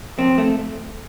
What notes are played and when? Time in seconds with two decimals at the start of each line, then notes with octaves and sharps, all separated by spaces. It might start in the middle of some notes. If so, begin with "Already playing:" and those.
0.19 F2 C4
0.38 A3